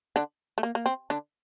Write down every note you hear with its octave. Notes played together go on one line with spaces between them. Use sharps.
D3 D4
A3
A#3
A#3
C4
D3 D4